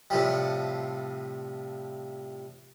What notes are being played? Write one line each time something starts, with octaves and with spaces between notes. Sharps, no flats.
A2 C3 F3 G3